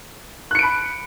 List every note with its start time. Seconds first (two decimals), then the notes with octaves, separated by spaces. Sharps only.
0.51 F#6
0.55 C#7
0.59 D7
0.63 B5